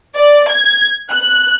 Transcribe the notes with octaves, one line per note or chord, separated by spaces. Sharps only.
D5
G#6
F#6